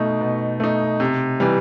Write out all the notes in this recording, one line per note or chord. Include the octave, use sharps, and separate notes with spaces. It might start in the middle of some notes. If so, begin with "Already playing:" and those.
Already playing: B2 A3 D#4
B2
A3 D#4
C3
E3 G3